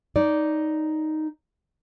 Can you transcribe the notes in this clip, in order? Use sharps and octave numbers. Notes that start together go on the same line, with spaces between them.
D#4 C#5 D5